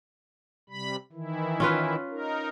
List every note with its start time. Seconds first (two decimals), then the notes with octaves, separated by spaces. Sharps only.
0.70 C3 G3 B5
1.12 D#3 E3 E4
1.60 C#4 F4 B4
2.10 D#4 A#4